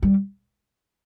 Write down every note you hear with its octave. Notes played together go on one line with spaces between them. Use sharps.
G3